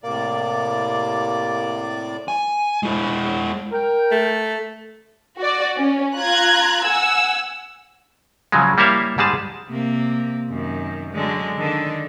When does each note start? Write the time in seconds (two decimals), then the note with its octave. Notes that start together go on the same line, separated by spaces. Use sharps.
0.03 A2 C3 A#3 D5
2.28 G#5
2.83 G#3 E4
3.73 A#4 G5
4.11 A3
5.39 F#4 D5
5.77 C#4
6.17 F4 A#5 F#6 G#6
6.86 F#5 G#5 E6
8.52 C#3 F3 F#3 G#3
8.78 G3 A#3 E4 C#5 E5 F5
9.18 G#2 G3 G#3 G#4 A5
9.70 C3 A#3
10.49 F#2 D#3
11.13 D3 F#3 G#3
11.58 D3 D#3 D4